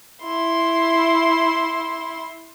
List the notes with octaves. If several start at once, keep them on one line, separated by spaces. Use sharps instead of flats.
E4 C6